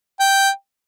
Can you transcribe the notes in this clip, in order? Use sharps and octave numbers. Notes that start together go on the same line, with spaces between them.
G5